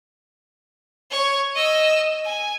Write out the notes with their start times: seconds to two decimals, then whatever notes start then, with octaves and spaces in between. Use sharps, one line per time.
1.11 C#5
1.55 D#5 E6
2.25 G#5